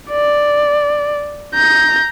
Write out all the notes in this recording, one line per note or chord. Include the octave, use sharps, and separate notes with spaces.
D5
A#5 G6